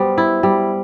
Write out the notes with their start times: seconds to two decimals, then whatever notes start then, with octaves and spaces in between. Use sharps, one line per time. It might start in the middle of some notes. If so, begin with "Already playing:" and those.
Already playing: G3 B3 C5
0.18 E4
0.43 G3